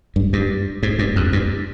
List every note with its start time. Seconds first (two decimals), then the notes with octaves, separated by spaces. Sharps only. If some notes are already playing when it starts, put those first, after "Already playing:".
0.16 G2
0.33 G2
0.83 G#2
0.99 G2
1.16 F2
1.33 G2